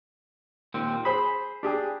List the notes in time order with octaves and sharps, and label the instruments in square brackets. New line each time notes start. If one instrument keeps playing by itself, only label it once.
[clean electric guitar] D#2 A#2 C4
[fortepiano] G#4 C5 [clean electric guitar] B5
[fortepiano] D4 G4 G#4